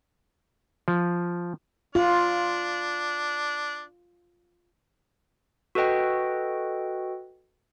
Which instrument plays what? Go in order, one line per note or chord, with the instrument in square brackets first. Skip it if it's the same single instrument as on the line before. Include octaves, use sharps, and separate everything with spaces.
[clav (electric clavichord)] F3
[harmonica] D4 [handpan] F4
[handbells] F#4 A4 B4 D#5 G5